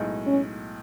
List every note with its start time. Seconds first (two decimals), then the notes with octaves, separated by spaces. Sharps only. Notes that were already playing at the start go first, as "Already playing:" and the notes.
Already playing: B1 A2 G#3 D#4
0.27 C#4